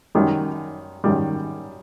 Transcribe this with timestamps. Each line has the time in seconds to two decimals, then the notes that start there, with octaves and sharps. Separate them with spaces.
0.15 F#2 D#3 G3
1.04 F#2 D#3 G3